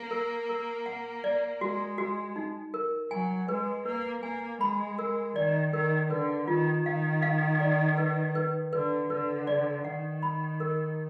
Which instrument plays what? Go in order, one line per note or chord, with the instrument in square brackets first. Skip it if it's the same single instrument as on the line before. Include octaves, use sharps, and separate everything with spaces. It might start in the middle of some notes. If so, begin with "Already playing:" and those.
Already playing: [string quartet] A#3
[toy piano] A#4
A#4
F#5
D5
[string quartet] G#3 [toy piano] F#4
[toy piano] F#4
D#4
A#4
[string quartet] F#3 [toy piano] G#5
[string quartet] G#3 [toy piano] B4
[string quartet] A#3 [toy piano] B4
[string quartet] A#3 [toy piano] G#5
[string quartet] G#3 [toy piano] B5
[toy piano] A#4
[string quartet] D#3 [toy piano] D5
[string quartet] D#3 [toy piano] A#4
[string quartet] D3 [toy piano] B4
[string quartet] D#3 [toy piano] F4
[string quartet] D#3 [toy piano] F5
[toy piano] F5
D5
B4
B4
[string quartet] D3 [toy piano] B4
[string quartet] D3 [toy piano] B4
[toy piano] D5
[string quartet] D#3 [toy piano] F#5
[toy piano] B5
A#4